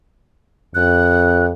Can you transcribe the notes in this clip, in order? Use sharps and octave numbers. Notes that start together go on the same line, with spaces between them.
F2 F#6